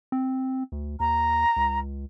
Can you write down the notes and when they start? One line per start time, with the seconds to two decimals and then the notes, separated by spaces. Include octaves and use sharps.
0.12 C4
0.72 D2
1.00 D#2 A#5
1.56 C#2